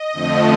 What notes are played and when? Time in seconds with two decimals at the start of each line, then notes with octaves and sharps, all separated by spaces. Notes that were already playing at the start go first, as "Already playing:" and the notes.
Already playing: D#5
0.13 F2 D3 F3 A3